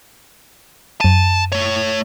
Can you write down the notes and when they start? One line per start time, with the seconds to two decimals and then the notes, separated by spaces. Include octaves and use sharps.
1.01 F#2 A5 D#7
1.52 A3 C#5